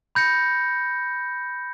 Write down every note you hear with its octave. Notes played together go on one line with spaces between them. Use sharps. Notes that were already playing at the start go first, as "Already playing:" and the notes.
B5 G6 A#6 C#7